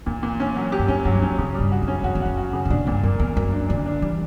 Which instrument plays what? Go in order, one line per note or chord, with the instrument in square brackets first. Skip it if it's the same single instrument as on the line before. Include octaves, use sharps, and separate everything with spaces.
[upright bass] E2 [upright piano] A#2
[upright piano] A#2
C#4
F#3
G4
[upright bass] G2
[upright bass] F#2 [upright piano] C#4
[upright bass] G2 [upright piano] F#3
[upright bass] F#2 [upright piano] C#4
[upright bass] A#2 [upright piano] C#3
[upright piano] G3
[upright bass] G2
[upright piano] F#4
[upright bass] F#2
[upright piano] C#4
[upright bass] F#2 [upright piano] F#4
[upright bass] E2
[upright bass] F#2 [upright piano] F#4
[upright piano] F#4
C#3
[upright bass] G2
[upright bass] A#2 [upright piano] D4
[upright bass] G2 [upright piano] A#2
[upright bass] F#2 [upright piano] A#3
[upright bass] E2 [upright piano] A#4
[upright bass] F#2 [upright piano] A#4
[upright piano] D4
[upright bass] D3 [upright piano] D4
[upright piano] D4
[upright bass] E3 [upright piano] G3